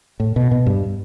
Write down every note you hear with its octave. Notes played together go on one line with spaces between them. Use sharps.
A2
B2
B2
G2